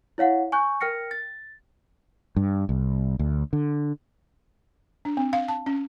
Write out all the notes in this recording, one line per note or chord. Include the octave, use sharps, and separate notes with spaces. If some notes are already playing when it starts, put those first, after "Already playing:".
E4 C#5 F5 F#5
G#5 C#6 F#6 G6
A#4 G5 F6 A#6 C#7
A6
G2
C2
D2
D3
D4
C4
F5
A5
C#4